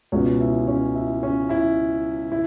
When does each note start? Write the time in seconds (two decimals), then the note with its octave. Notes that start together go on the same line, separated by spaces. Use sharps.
0.12 C#2 B2 G#3 C#4 C#5
0.40 E4 E5
0.68 C#4 C#5
0.95 E4 E5
1.23 C#4 C#5
1.49 E4 E5
2.32 E4